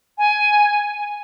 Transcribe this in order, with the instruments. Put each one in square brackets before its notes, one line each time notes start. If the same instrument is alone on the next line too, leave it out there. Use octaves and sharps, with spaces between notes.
[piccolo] G#5